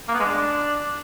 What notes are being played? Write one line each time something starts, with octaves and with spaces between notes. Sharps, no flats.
A#3
B3
G#3
D4